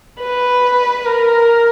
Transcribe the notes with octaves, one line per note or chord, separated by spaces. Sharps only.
B4
A#4